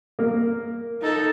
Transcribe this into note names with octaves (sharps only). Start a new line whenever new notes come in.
A#3 A#4
D#4 A4